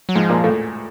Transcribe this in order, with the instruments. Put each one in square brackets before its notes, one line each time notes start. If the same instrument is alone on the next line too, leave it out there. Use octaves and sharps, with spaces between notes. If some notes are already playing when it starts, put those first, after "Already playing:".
[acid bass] F#3
[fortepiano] G#2 G#3 [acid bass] F3
[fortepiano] A#2 A#3
A2 A3